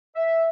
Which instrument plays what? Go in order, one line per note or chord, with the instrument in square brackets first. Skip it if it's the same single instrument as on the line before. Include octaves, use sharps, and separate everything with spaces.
[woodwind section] E5